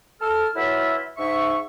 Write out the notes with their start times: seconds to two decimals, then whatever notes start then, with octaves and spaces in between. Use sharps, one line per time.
0.20 A4 F6
0.54 E3 F#3 E4 F4 E5
1.18 G#2 E5 C#6